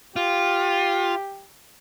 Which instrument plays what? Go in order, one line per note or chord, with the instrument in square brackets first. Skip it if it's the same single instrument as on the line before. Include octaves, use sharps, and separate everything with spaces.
[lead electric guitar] F4 [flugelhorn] G4